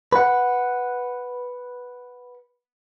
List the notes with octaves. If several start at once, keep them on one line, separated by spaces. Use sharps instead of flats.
B4 F#5